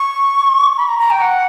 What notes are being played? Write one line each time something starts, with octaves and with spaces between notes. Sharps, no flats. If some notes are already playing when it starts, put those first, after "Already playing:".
Already playing: C#6
B5
A#5
A#5
G5
F#5